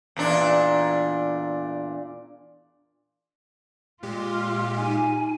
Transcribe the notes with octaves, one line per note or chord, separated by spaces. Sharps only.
E2 A#2 D4
A#2 G#3 F4 G4
D#4 G#5